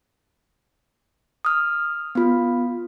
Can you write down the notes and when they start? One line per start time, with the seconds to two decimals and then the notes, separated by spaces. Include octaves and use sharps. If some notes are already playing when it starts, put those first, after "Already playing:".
1.45 D#6 F6
2.15 B3 F4